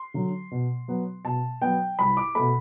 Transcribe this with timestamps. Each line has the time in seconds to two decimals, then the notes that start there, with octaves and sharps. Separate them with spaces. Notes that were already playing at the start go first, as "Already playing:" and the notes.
Already playing: C6
0.14 D3 F#3
0.51 B2
0.88 F#3 B3
1.25 B2 A5
1.62 F#3 B3 G5
1.99 C2 B5
2.17 D6
2.35 B2 A3 B5